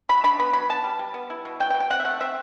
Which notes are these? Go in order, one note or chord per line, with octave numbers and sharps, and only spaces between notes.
F#3 B5
D4 B5
B3 B5
F#3 B5
B3 A5
G3
G3
B3
E4
B2
F#3 G5
G5
B2
G5
C4 F#5
E5
A3 F#5
C4 E5